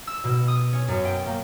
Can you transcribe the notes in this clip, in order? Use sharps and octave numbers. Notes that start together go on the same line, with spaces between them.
E6
B2
D#6
C#4
F#2
G5
A#3